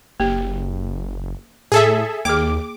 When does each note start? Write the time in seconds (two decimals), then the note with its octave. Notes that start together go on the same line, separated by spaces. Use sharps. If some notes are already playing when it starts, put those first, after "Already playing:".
0.20 F#1 A#3 G4
1.72 A2 G#4 A4 E5
2.25 D#2 A#3 G#4 D6